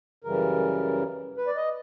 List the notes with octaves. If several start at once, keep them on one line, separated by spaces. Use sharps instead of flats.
F#2 C#3 E3 G3 A#4
B4
D5
D#5